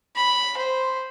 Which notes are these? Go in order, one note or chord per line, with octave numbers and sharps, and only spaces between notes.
B5
C5